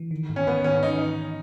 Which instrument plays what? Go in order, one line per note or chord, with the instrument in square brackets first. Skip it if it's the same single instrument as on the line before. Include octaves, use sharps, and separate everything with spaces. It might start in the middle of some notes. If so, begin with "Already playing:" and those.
Already playing: [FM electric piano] E3
D#3
G#2
[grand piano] C#4
[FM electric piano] G#2 [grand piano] B3
[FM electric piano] D#3 [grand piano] C#4
[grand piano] D#4